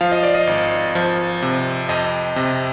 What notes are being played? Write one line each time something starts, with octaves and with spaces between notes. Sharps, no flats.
F3 F5
D#5
D5
D#5
G#1
F3
C3
F2 D#5
C3